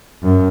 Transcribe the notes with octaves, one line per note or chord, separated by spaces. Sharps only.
F#2